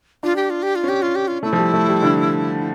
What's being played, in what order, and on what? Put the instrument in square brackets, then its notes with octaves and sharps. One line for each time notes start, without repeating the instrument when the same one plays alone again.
[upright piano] D4 [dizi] F4
[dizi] G4
F4
G4
F4
[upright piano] C#4
[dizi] G4
F4
G4
F4
[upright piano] A3 [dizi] E4
[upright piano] F3
G3
A3
G3
D3